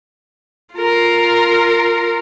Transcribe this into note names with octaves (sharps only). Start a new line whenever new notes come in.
F4 A#4